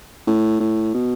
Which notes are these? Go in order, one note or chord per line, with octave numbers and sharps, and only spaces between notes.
A2
A2
B2